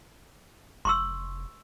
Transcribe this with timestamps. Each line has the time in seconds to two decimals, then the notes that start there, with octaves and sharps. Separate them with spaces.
0.85 F1 C6 C#6 E6